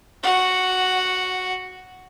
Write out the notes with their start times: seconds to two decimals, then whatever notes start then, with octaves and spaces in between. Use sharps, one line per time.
0.24 F#4 F#5